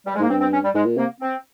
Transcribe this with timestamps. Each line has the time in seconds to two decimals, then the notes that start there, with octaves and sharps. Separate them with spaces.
0.06 G3
0.15 G#3
0.19 G#2 A#3
0.29 G2 C4
0.40 C4
0.52 C#4
0.63 G3
0.74 G#2 G#3
0.86 A#2
0.97 C3 A#3
1.20 C4